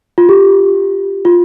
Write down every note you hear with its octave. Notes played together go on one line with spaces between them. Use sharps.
F4
G4
F4